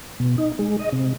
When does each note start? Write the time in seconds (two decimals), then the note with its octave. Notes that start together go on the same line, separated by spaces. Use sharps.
0.20 B2
0.38 D#4
0.59 G#3
0.79 D#5
0.92 C3